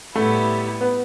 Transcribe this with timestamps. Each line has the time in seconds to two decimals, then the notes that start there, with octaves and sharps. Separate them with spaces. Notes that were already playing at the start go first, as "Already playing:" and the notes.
0.15 A2 G3 A3 B3 E4
0.81 B3